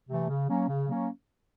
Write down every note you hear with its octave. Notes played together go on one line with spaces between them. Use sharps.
C3 E3 A3
C#3
F#3 A#3 C#4
C#3
F#3 A#3 C#4